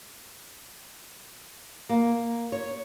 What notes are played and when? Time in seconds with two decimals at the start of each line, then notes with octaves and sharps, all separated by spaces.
1.89 A#3
2.52 C#5